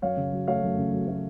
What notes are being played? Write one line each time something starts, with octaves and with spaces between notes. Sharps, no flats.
F#2 C#5 F5
C#3
F#3
A3 C#5 F5
F#2
C#3
F#3
A3